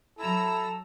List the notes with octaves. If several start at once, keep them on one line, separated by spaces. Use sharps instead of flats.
F#3 E4 A4 A#5 E6